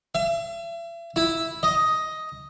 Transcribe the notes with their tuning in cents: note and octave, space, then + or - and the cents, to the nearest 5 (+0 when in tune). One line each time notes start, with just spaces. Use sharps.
E5 +40
E4 -5
D#5 +5